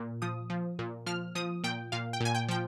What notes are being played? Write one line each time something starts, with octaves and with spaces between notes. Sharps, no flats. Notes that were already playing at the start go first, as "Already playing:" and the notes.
Already playing: A#2
F3 D#6
F3
A#2
F3 F6
F3 D#6
A#2 G5
A#2 F5
G5
A#2 G#5
G5
F3 G5